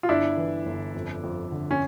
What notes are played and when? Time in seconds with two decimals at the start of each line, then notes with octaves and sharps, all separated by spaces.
0.03 F4
0.09 G1 D4 E4
0.37 E3
0.66 G1
0.94 F2
1.23 F2
1.51 D3
1.71 C#4